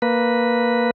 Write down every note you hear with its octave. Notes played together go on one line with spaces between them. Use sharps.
A#3 B4